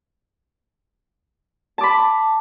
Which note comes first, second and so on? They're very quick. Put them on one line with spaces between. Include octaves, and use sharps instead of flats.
A5 D6 B5